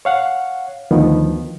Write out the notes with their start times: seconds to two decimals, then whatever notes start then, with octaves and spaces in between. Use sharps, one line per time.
0.05 C#5 F5 F#5
0.91 D2 D#3 F3 B3